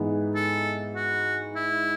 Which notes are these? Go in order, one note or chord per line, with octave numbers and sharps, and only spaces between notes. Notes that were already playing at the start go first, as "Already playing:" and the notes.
Already playing: G#2 E3 G#3 B3 D#4
A4
F#4
E4